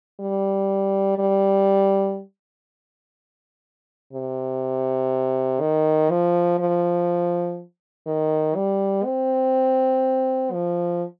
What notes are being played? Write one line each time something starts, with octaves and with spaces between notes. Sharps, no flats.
G3
G3
C3
D#3
F3
F3
D#3
G3
C4
F3